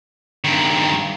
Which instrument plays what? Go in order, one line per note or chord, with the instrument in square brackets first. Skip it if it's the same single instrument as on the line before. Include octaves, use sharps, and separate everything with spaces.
[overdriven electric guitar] G2 D#3